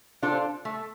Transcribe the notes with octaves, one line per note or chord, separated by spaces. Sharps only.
D4 F4 A4 C5
A3